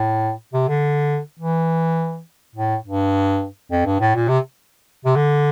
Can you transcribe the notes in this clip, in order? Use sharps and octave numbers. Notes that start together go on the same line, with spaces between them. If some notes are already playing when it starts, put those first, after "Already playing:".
Already playing: A2
C3
D3
E3
A2
G2
F2
G2
A2
A#2
C3
C3
D3